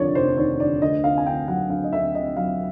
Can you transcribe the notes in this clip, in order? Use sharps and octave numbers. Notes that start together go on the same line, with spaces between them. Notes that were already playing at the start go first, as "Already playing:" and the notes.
Already playing: F1 D#2 D3 F3 C#5 D5
F1 C5
D#2 C#5
D3 D5
D2 D#5
D2 F5
G#5
D3 G5
F#3 F#5
D2 F5
D#5
D2 E5
D3 D#5
F#3 F5